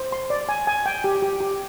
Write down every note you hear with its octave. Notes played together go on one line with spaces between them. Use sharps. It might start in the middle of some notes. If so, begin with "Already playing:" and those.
Already playing: C5
C6
D5
G#5
G#5
G5
G4
G4
G4